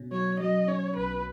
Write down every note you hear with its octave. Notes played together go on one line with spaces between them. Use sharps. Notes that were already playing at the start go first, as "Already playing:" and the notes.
Already playing: B2 C#4
F#3 C#5
F#3 D#5
C#4 C#5
B1 B4